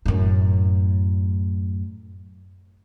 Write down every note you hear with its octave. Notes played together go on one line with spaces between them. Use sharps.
F#2 A2